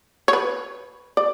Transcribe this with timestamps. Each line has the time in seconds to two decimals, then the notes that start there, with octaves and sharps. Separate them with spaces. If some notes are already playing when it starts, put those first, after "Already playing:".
0.28 C#5
0.33 B4
1.17 D5